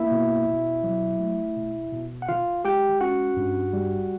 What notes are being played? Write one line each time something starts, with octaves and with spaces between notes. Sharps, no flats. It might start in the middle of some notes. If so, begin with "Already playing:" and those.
Already playing: A#3 E4 E5
B2
B2
F#3
A3
B2
B2
F#5
D#3 F4 F5
G#3 G4 G5
C#4 F#4 F#5
G2
G3